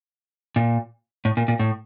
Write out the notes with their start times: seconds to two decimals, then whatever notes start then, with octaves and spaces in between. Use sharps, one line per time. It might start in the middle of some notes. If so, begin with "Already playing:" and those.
0.56 A#2
1.25 A2
1.37 A#2
1.48 A#2
1.59 A2